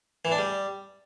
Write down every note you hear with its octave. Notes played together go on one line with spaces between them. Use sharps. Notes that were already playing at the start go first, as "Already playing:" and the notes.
E3
D4
G3